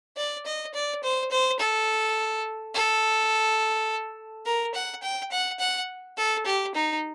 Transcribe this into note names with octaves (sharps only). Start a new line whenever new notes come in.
D5
D#5
D5
C5
C5
A4
A4
A#4
F#5
G5
F#5
F#5
A4
G4
D#4